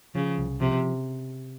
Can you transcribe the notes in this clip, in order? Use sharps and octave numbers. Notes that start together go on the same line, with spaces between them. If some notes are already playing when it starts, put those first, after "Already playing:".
C#3 F3
C2
C3 F3